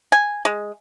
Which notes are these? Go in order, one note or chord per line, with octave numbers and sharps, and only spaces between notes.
G#5
G#3